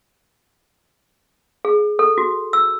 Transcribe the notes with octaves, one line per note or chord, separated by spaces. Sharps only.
G#4
A4
F#4
E6